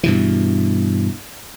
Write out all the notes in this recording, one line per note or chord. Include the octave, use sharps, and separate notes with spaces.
G2 B2 E3